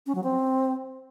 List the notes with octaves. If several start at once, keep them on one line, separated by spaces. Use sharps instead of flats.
C#4
F#3
C4